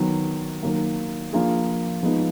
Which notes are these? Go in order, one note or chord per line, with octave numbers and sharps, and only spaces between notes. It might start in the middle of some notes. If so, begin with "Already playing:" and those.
Already playing: D#3 F#3 B3
D#3 F#3 A#3
F3 A#3 D4 F4 G#4
F3 G#3 B3 D#4